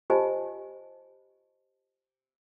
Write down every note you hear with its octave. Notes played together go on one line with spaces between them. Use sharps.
F4 G4 C5 D#5 G#5 A5